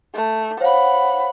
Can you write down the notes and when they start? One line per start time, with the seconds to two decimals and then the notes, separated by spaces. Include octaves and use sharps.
0.15 A3
0.60 C5 C#5 F5 F#5 B5